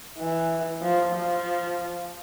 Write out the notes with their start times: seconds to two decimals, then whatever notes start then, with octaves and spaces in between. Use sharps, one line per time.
0.18 E3
0.82 F3
1.14 F3